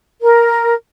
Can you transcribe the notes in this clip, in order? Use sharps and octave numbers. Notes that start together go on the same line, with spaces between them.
A#4